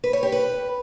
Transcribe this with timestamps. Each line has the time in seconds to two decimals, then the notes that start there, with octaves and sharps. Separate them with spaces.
0.04 B4
0.13 C#5
0.23 G4
0.32 B4